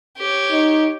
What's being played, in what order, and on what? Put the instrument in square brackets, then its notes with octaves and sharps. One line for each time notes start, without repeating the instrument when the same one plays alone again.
[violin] G4 C#5
[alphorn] D#4